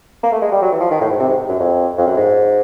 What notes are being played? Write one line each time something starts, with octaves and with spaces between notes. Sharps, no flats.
A#3
A3
G#3
G3
F#3
E3
F3
D#3
A2
G#2
C3
G#2
F#2
F2
F2
F#2
G#2